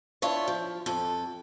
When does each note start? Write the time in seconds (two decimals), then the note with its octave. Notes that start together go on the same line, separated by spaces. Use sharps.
0.22 D4 E4 F4 C#5
0.48 F3
0.86 F2 A4